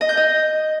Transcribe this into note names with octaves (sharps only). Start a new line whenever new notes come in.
D#5
G6
D#5